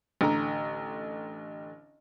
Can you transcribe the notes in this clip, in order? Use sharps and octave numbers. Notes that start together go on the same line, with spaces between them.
A1 D3 A#5